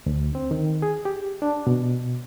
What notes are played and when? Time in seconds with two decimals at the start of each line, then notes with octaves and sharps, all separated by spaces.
0.06 D2
0.35 C4
0.51 D#3
0.82 G#4
1.05 G4
1.42 D4
1.67 B2